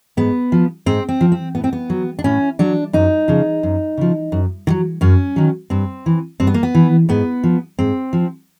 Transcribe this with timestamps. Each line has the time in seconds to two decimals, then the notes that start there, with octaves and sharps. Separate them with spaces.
0.17 G#2 B3
0.52 F3
0.86 G#2 C4
1.09 C4
1.21 F3
1.32 C4
1.55 A2 B3
1.64 C4
1.73 B3
1.90 F#3
2.19 D4
2.24 A2 C#4
2.59 F#3 D4
2.93 F#2 D#4
3.28 C#3 F3
3.63 F#2
3.97 C#3 F3
4.32 F#2
4.67 D#3
4.70 F#3
5.01 F#2 C#4
5.36 D#3 F#3
5.70 G2 C4
6.06 E3
6.40 G2 C4
6.47 B3
6.54 A#3
6.63 B3
6.75 E3
7.09 G#2 B3
7.44 F3
7.79 G#2 C4
8.13 F3